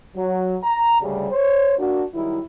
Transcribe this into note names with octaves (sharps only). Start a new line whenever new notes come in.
F#3
A#5
D2 C#3 G3
C5 C#5
A#3 D4 F#4
D#3 F#3 G3 E4